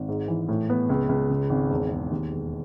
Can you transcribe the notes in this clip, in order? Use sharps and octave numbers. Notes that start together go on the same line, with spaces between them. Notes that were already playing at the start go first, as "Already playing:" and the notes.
Already playing: G#1
G#2
E3
A2
B3
C#2
C#2
C#3
G#1
E1
E1
D#2
E1